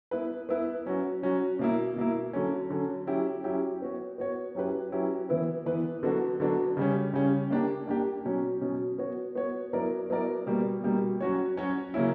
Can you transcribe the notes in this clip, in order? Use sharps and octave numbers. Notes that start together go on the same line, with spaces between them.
B3 E4 B4
B3 E4 B4
F#3 C#4 F#4
F#3 C#4 F#4
B2 A#3 E4
B2 A#3 E4
D3 F#3 C#4
D3 F#3 C#4
F#3 C#4 E4 G4
F#3 C#4 E4 G4
B3 F#4 C#5
B3 F#4 C#5
F#3 C#4 E4 G4 B4
F#3 C#4 E4 G4 B4
E3 B3 E4 B4
E3 B3 E4 B4
D3 F#3 B3 D4 F#4
D3 F#3 B3 D4 F#4
C#3 G3 C#4
C#3 G3 C#4
A#3 D4 G4
A#3 D4 G4
B2 F#3 C#4
B2 F#3 C#4
B3 F#4 C#5
B3 F#4 C#5
F#3 B3 E4 A#4 D5
F#3 B3 E4 A#4 D5
B2 G3 A#3
B2 G3 A#3
F#3 C#4 F#4 C#5
F#3 C#4 F#4 C#5
C#3 F#3 A#3 C#4 E4